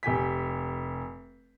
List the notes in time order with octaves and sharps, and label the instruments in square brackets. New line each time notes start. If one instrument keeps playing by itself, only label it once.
[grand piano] F1 G4 G#5 B6